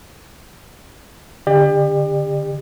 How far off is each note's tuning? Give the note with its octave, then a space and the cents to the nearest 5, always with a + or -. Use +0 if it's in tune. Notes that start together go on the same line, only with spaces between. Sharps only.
D3 +0 G4 +30 D5 +35